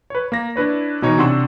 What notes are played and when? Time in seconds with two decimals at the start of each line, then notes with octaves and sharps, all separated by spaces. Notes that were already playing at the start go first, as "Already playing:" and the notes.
0.10 B4 C#5
0.32 A#3 A#6
0.56 D4 E4 B4 C#5
1.02 B2 E3 D#4 C#5
1.18 C3 D4 F#5 C6 C#6 E6